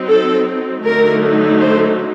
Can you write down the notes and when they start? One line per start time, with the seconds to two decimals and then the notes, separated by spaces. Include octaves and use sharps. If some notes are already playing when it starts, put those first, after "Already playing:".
Already playing: F#3 C4 D#4
0.08 A4
0.83 D3 F#3 A3 D#4 A#4
1.60 C5